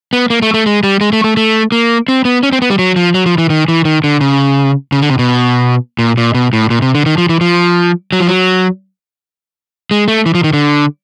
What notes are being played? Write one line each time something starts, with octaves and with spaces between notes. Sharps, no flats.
B3
A#3
A3
A3
G#3
G3
G#3
A3
A3
A3
A#3
C4
B3
C#4
C4
B3
G3
F#3
F3
F#3
F3
E3
D#3
E3
D#3
D3
C#3
C#3
D3
C3
B2
A#2
A#2
B2
A2
A#2
C3
D3
D#3
F3
E3
F3
F#3
F3
F#3
G#3
A3
E3
F3
D#3
D3